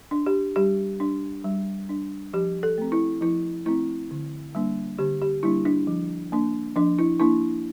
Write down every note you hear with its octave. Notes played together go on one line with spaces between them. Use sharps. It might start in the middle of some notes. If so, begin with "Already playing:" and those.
D4
G4
G3 G4
D4
G3
D4
F3 G4
A4
A3 C4
E4
F3 E4
A3 C4 E4
D3
G3 A#3 D4
D3 G4
G4
G3 A#3 D4 E4
D4
F3
A#3 D4
F3 D4
E4
A#3 D4 E4